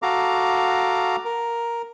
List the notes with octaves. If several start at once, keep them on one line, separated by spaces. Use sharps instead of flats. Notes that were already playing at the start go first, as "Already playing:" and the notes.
F#4 A4 F5 A#5 D6
A#4